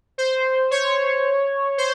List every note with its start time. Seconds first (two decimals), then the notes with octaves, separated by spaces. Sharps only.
0.18 C5
0.71 C#5
1.78 C5